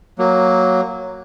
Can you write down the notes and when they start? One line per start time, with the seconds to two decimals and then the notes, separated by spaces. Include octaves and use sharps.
0.18 F#3 A#3